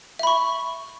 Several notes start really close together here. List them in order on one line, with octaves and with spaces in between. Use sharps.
E5 B5 C#6